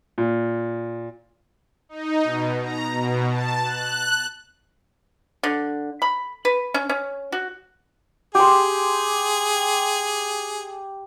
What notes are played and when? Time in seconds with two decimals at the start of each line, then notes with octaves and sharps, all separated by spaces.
0.18 A#2
1.89 D#4
2.24 B2
2.61 A#5
2.93 B2
3.30 A5
3.62 F#6
5.43 D3
6.02 B5
6.45 B4
6.74 C#4
6.89 C#4
7.32 F#4
8.35 G4 G#4 C6